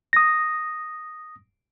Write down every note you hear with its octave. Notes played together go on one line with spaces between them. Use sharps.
D#6 A#6